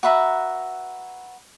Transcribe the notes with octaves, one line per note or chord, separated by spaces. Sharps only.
F#4 B4 E5 A#5